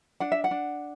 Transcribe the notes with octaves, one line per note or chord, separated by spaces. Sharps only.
D4 F#5
E5
F#5
D4